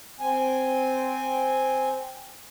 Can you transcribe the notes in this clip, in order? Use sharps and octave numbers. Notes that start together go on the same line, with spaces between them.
C4 G#5